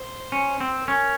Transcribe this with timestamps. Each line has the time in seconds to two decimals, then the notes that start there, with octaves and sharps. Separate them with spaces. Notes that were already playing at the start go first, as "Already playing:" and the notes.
Already playing: C5
0.32 C#4
0.60 C4
0.87 C#4 A#4